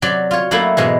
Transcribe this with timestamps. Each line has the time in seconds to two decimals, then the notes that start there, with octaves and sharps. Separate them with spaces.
0.02 C3 F#3 D5
0.31 F4 C#5
0.51 F#3 A3 A#3 E4
0.77 G#2 B2 E3 G#3